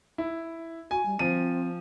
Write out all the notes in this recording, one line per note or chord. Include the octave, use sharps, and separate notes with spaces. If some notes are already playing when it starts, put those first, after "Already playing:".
E4
F#4 G#5
G3
F3 C4 D#7